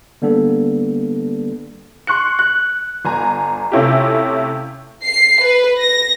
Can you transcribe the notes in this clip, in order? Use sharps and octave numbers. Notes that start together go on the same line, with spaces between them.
D3 G3 A#3 B3 D4 A4
C6 C#6 F#6 C#7
F#6
G1 G#5 A#5
C3 A3 C#4 E4 F4 G4
C7
B4
A#6